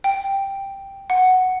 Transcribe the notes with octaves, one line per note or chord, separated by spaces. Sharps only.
G5
F#5